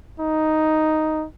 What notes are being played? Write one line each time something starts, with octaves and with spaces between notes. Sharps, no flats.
D#4